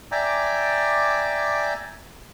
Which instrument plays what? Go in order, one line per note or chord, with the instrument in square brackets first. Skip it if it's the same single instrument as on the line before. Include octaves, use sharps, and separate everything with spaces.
[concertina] D5 E5 G5 G#5 A#5 D6